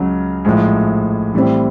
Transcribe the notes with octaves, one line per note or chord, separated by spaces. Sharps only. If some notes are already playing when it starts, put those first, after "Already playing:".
Already playing: C#2 C#3 F#3
A#1 A2 F3 G#3
A2 E3 G3 C4